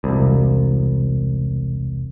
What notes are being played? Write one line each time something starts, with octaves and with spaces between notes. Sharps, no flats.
E1 C2